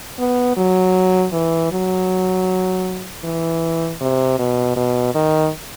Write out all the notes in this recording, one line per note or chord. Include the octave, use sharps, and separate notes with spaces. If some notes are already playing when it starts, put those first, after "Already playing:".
B3
F#3
E3
F#3
E3
C3
B2
B2
D#3